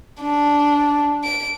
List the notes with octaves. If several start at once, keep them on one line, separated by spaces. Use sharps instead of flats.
D4
D7